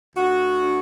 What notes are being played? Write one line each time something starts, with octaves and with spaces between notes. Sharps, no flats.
D2 F#4
D3